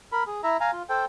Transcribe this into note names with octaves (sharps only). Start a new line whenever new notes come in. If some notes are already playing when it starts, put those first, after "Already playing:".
A#4 B5
G#4
E4 E5 A#5
F5 G#5 A#5
F4
A4 C5 G5